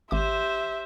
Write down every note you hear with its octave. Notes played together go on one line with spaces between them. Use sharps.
G#1 G4 C5 E5 D6